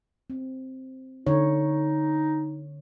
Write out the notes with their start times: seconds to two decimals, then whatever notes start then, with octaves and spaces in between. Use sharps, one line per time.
0.30 C4
1.26 D3 D#4 C#5